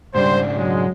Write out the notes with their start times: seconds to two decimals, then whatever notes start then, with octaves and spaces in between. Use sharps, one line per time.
0.15 G#2 C#3 G3 D4 C5
0.57 F#3 G#3